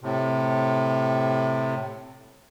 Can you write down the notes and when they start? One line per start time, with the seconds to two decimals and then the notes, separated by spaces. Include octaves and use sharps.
0.01 A2 C3